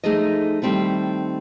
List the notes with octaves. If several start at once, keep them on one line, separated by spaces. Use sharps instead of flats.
F3 A3 D#4 G#4 A4 D#5
D#3 G3 A3 C4 E4 A4